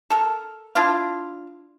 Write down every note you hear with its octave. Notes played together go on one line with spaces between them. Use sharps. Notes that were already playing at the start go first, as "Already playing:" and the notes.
A4 A#4
D4 E4 F4 F5